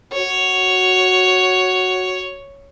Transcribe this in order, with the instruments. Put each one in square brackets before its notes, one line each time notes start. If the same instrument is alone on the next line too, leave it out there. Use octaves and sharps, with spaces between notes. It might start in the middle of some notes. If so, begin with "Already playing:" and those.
[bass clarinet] F#4 [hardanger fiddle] C#5